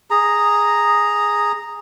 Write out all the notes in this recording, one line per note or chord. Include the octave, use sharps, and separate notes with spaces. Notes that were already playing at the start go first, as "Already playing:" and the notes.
G#4 A#5